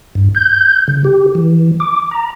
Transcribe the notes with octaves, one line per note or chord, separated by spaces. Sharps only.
G2
G6
C#3
G4
E3
D6
A#5